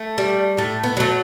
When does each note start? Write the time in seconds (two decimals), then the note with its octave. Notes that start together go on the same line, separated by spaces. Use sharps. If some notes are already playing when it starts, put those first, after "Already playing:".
Already playing: A3
0.18 G3
0.57 A2 A3
0.84 B3
0.97 F#3 A3